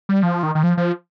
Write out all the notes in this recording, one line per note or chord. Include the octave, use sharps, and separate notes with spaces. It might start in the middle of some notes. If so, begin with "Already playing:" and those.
G3
F3
D#3
D#3
F3
F3